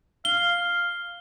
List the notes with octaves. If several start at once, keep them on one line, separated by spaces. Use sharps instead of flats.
F5 G7